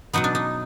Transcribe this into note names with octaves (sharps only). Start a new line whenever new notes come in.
B2 F#3 B3 D#4
D4
D#4